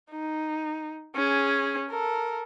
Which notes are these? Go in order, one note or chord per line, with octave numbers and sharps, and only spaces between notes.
D#4
C#4 G#4
A4 A#4